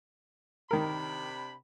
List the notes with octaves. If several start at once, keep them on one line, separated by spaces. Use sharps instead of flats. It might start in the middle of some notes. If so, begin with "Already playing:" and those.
C3 D#3 D4 A#4 B5